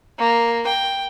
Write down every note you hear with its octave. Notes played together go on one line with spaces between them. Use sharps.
A#3
G5